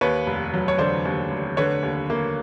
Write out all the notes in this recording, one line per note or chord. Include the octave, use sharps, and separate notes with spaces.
D#2 B4 C#5
F1
F#3
C#5
D3 C5 D5
D#2
F1
D3 B4 C#5
D#2
A#3